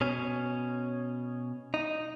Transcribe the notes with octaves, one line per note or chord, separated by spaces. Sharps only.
B2 C#4
D#4